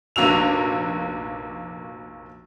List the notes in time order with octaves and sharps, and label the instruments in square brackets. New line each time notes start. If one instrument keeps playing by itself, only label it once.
[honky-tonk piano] F1 A#1 A#3 F#4 E6 F7